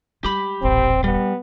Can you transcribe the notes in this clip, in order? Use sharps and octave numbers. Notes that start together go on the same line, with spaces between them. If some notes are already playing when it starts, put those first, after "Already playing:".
G3 G#3 G4 B5
D#1 A1 C4
G3 B3